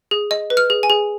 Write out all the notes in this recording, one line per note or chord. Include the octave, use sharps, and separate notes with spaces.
G#4
D#5
B4
F6
G#4
G#5
G#4